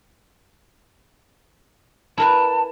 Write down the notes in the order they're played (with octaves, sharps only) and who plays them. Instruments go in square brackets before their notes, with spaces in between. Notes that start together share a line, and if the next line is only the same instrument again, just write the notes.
[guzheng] E4 A#4 B4 [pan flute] A5